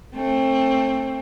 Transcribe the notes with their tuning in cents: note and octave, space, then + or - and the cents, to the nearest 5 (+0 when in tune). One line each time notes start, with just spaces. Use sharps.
A3 +20 C4 +25